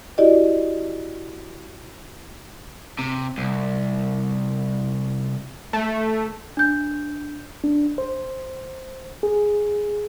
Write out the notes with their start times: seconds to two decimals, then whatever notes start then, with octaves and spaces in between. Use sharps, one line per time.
0.18 E4 F#4 G4 D5 D#5
2.99 C3
3.38 C2
5.73 A3
6.57 D4 G6
7.64 D4
7.98 C5
9.23 G#4